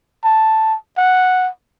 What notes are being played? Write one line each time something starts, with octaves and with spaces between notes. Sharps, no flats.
A5
F#5